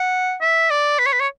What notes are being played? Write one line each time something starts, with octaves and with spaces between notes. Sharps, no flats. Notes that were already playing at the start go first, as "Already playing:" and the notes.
Already playing: F#5
E5
D5
B4
C#5
B4
C#5